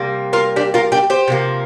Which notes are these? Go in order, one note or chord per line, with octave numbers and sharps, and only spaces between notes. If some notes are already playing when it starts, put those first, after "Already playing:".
Already playing: C3 G3 A#3
F4 A#4
D4 G4
F4 A#4
D4 G4
G4 C5
C3 F3 A#3